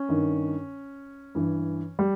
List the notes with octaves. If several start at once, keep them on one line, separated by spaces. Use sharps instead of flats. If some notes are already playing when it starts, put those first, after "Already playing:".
Already playing: C#4
G2 D#3
G2 E3
G3